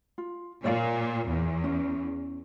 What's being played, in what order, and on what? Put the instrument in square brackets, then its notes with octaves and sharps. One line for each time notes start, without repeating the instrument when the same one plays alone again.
[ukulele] F4
[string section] A#2 [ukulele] C#5 D5 F5
[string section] E2
[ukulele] C#4